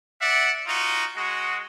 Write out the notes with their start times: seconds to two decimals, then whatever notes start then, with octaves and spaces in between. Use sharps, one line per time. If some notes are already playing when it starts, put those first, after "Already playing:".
0.22 D5 E5 F#5
0.67 D#4 F4 F#4
1.16 G#3 F#4